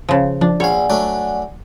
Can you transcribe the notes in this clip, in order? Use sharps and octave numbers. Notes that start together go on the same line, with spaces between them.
C#3 F3
F3 D4
A#1 C#5 D5 F5 F#5 G#5
F#3 A3 D4